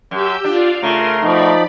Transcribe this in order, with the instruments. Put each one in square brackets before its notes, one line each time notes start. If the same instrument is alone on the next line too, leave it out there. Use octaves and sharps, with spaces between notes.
[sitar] F#2 [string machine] G4 E6 G6
[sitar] D4 [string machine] F4 D5 F5
[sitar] C#3 [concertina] A3 A#5 [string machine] A#4 C6
[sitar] B2 [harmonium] F3 D#4 [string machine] D5 B5